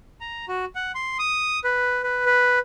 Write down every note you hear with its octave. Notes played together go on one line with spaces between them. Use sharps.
A#5
F#4
F#5
C6
D#6
B4
B4
B4